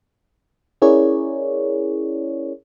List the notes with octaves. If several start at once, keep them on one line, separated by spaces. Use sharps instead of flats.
C#4 E4 G#4 A#4 C#5 D5